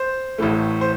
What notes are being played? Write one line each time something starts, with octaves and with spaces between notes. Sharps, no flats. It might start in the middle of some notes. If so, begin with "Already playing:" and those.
Already playing: C5
A1 A2 E3 A3
C5